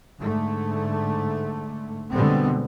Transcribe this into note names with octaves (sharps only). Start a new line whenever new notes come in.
G#2 D3 A3
B2 D3 G3 G#3 B3 C4